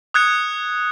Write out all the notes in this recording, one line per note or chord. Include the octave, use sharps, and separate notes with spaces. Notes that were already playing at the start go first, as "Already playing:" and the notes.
D#6 F#6 G#6 C#7